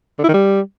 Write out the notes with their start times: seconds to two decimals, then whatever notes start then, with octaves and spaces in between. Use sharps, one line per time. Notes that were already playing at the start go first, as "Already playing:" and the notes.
0.19 D3
0.24 E4
0.29 D#3
0.34 G3